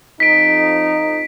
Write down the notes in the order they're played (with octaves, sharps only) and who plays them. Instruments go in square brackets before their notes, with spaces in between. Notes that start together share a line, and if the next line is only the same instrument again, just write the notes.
[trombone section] F2 D#4 [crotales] B6 D7